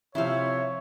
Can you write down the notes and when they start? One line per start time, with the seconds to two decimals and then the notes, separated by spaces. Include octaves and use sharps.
0.15 C3 F3 E4 C5 C#5 E5 F5